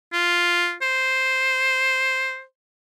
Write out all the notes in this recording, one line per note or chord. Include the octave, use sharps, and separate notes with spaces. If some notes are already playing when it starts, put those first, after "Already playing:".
F4
C5